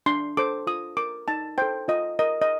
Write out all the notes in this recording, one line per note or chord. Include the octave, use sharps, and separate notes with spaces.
D4 C6
A4 C5 D6
F4 D#6
A#4 D6
D#4 A5
A4 C5 G5
F4 D#5
A#4 D#5
D#5